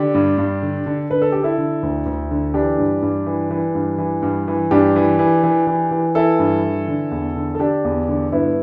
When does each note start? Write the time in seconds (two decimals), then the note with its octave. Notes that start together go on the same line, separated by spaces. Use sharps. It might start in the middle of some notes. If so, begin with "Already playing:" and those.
Already playing: D3 D4 G4
0.14 G2
0.38 G2
0.63 D3
0.86 D3
1.10 D3 B4
1.22 A4
1.32 D3 G4
1.43 E4 A4
1.58 D3
1.83 D2
2.06 D2
2.31 D3
2.54 E3 D4 G4
2.78 G2
3.02 G2
3.27 E3
3.51 E3
3.75 G2
3.98 E3
4.22 G2
4.48 E3
4.71 G2 D4 G4
4.96 E3
5.19 E3
5.43 E3
5.67 E3
5.91 E3
6.15 E3 E4 A4
6.39 G2
6.64 E3
6.88 D3
7.11 E2
7.36 D3
7.55 A4
7.59 D3 D4 G4
7.85 E2
8.08 D3
8.32 G2 B3 E4